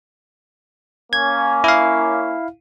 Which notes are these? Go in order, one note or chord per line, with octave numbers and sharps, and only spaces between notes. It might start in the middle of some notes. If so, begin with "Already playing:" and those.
A#3 C#4 G#6
E4 F5